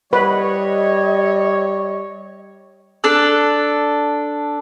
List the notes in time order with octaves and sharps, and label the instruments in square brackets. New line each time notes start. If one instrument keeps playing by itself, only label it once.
[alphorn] G3 [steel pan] B4 [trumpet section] C#5 [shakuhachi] D#5
[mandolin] D4 A4 F#6